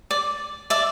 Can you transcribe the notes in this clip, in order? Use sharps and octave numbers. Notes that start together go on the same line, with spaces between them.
D5
D5 E5